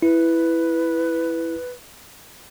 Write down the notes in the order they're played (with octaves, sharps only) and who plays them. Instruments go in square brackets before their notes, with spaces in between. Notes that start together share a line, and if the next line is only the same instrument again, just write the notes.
[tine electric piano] E4 [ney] B4